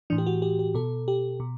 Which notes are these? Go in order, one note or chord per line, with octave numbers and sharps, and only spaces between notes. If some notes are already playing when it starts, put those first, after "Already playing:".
A2 E3 D4
G4
F#4
G4
G4
B2 A4
G4
B2